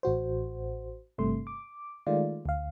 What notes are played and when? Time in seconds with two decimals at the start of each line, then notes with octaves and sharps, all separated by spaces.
0.03 A1 F#4 C5
1.18 G1 G2 C3 A3 C6
1.47 D6
2.07 D#3 G#3 A3 F4 D5
2.45 D2 F5